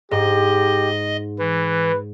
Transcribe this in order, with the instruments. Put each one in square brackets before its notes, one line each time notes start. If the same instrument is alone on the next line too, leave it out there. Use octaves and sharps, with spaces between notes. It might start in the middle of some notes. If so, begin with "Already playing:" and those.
[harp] G#2 [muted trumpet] G4 [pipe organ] D#5
[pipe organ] E3 [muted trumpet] B4